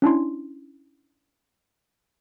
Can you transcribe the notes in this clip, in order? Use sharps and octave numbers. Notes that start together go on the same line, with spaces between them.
C#4 D4 E4 C6